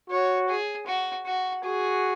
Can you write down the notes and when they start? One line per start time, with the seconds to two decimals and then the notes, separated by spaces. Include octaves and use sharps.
0.10 F#4 C#5
0.48 G#4
0.87 F#4
1.26 F#4
1.64 F#4 G#4